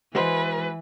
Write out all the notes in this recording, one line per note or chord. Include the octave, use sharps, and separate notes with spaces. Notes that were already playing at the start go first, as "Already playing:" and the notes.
E3 G#3 F#4 B4 C5